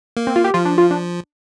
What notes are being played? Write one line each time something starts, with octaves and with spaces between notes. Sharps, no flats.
A#3
C4
F4
G4
F3 F4
D4
F4
D4